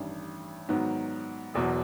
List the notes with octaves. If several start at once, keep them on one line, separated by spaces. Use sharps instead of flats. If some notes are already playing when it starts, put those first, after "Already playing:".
Already playing: A1 G2 D#3
G#2 D#3 F#3 B3
E1 E2 B2 F#3